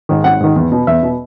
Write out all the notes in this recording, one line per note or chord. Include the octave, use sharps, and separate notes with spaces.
G#2 D#3
G#1 F#5
G#2 D#3
E2
B2
E2 E5
B2